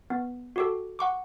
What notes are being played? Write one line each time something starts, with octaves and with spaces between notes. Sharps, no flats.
B3
F#4 G4 A4
F#5 C#6 D6